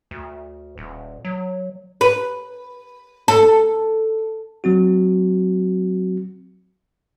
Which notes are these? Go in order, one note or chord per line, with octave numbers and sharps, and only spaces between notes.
D2
D#1
F#3
B4
A4
F#3 C4 F#4